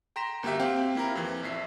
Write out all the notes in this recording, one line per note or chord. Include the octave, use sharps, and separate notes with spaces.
G5 A#5 C6 A#6 B6 E7
G1 A#3 F#4 G4 E5
C4 G4 F5 G5
A#3 E4 A#4
F2 E3
A#1 E5 C7